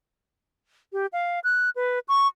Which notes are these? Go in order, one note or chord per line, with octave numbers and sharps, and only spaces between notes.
G4
F5
F#6
B4
C#6